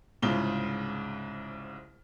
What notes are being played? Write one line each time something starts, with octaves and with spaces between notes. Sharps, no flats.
C2 G#2 C#3 F4 G7